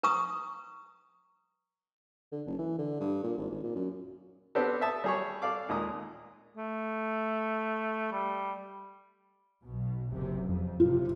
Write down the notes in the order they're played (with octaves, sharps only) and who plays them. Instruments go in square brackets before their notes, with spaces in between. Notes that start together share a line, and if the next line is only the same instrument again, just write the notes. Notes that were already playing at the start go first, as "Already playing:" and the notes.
[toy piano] B4 A#5 C#6 D#6
[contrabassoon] D3
F#1
E3
D3
G2
A#2
G#1
G#1
A#2
F#2
[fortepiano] B3 C4 D4 G4 A4
E5 A5 D#6
G3 G#4 C#5
A4 D5 F5 D6
D#2 A#2 G#3 A#5 D#6
[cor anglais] A3
G3
[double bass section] B1 B2
F#1 C3
F2
[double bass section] F#1 C3 [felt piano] F4